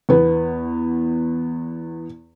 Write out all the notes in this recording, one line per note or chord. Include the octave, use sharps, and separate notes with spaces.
E2 B3